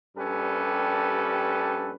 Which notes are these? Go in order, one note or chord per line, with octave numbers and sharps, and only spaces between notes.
A#1 G2 C#4 G4 A4 B4